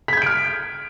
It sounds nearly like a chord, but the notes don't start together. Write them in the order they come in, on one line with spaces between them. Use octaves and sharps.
B6 G#6 G6 D7 F6